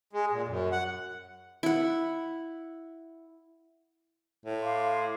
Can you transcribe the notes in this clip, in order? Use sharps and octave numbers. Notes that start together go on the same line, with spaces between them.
G#3
A#2
F#2
F#5
E4 F#5
A2
F5 C6 D6